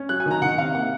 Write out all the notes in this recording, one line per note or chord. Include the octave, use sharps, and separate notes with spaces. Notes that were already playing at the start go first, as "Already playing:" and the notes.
Already playing: C#4
F#3 F#6
G#5
D#3
A#5
D#3 F#5
C3 F5
A#3 F#5